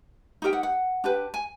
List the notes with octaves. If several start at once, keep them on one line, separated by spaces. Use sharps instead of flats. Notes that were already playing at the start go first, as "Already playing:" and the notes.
D#4 G4 A#4 G5
F#5
F#5
D4 G4 B4
G#5